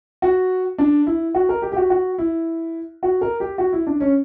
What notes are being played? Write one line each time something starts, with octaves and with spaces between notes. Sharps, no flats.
F#4
D4
E4
F#4
A#4
G4
G4
F#4
F#4
E4
F#4
A#4
G4
F#4
E4
D4
C#4